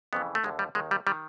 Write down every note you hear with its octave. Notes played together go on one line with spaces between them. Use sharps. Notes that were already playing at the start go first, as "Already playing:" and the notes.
F2 C#3 E3 B3
A3
D#2 D3 G#3
G3
D#2 D#3 G#3
G3
D#3 G3